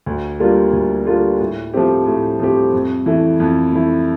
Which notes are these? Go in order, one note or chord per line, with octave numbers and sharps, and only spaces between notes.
D2
D3 G3 A#3 F4
D2
D3 G3 A#3 F4
A2
F3 A3 C4 G4
A2
F3 A3 C4 G4
F2
E3 A3 E4
F2
E3 A3 E4